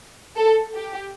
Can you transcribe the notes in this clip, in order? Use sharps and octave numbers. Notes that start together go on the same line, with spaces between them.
A4
G4